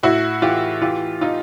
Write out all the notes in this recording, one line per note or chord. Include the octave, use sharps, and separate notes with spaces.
A2 E4 F#4
E3 F4 G4
E3 F4 G4
E3 D#4 F4